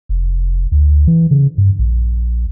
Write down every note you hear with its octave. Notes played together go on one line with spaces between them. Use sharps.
F1
D2
E3
C#3
G2
A#1